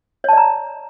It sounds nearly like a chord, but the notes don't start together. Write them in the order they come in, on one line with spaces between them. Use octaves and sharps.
C#5 A5 D5 A#5